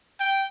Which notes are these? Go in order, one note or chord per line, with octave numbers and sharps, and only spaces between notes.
G5